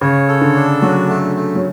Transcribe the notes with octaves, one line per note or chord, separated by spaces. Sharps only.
C#3 C#5
A4
D3
D4
F#3 F#4
A3
A3
F#3